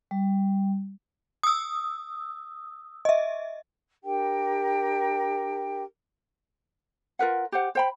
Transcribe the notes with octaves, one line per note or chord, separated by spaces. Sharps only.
G3
D#6 E6
D#5 E5
D4 G4 A#4 G5
F4 A#4 B4 F#5
G4 C5 F#5
C5 G5 B5